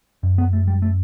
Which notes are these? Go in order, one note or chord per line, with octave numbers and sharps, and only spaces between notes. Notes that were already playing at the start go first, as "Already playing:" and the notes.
F#2
B3
A3
G3
A3